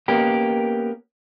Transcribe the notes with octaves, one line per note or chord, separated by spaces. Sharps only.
A#3 B3 C#4 G4 A#4